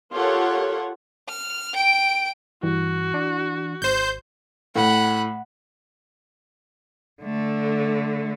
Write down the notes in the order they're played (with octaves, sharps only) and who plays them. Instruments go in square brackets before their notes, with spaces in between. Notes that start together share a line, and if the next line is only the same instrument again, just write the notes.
[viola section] F4 G4 A4 A#4 C#5 F#5
[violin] F6
G5 D7
[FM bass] G2 [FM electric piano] E3 [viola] F#4
[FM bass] D4
[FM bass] G#1 [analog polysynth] C5 G6
[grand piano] A2 [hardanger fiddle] F#5 B5
[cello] D3 A3